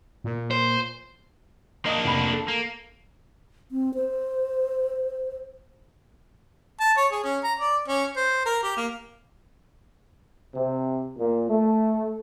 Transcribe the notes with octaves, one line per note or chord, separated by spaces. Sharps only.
A#2
C5
A#3 D4 D#5 D#6
F1 B5
A4
A#3
C4
C5
A5
C#5
G#4
C#4
A#5
D5
C#4
C5
A#4
G4
A#3
C3
A#2
A3